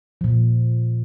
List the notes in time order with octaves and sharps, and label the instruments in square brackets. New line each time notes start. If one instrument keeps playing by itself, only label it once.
[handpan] A#2 F3